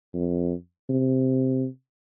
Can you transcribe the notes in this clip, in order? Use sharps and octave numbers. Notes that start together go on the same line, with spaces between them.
F2
C3